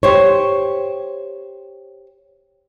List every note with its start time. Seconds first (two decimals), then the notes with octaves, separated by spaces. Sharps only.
0.03 G4 C5 C#5